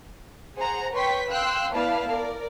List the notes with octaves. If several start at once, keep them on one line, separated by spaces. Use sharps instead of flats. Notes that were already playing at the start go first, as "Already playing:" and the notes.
G#4 C5 F#5 A#5
B4 C#5 G5 C6 C#6 B6
F5 G5 C6 E6 F#6
B3 E4 B4 D5 F5 A5
A#4 D5